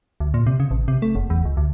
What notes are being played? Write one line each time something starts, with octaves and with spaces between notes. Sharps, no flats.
D2
A#2
C3
C#3
A1
C3
A3
F#1
E2
C#2
D2